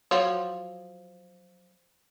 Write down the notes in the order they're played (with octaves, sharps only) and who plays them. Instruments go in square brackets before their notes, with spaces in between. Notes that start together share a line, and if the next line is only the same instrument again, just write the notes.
[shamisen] F3 F#3 C#5